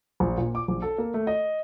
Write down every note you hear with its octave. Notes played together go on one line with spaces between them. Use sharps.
A#1
A#2
D6
A#1
A4
A#3
A3
D#5